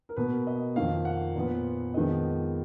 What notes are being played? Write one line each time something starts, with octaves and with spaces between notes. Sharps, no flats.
A#4
B2 A#3 B4
D#5
F2 D#3 A#3 F5
F#5
A#2 F3 B3
F2 D#3 G#3 B3 D#5